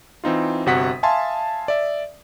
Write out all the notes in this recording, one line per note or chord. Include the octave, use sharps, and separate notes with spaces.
E3 C4 D#4 F4
G1 C3 F#4 F#5 D#6 B6
E5 F5 G#5 A5 C6
D5 E5